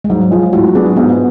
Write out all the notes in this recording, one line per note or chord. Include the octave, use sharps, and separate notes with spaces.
G#3
G#2 F#3
F3 G#3 F4
A2 F#4
F#3 B3 D4 G#4
G#2 B3